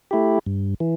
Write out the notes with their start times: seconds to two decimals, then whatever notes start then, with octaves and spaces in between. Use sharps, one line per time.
0.11 A3 E4 G4
0.46 G2
0.80 E3